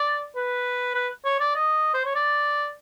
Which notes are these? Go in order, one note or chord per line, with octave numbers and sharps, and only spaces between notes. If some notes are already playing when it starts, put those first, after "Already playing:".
Already playing: D5
B4
B4
C#5
D5
D#5
C5
C#5
D5